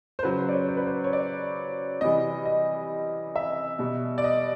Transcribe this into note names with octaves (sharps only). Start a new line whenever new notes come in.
C5
C#3 F#3 B4
C5
D5
C#5
C5
B4
C5
C#5
D5
C3 E3 G3 D#5
D#5
E5
B2 G3
D5
D#5